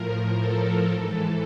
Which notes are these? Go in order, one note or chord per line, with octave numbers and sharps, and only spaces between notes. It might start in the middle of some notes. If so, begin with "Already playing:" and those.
Already playing: A2 F3 A#4
A4
G#2 E3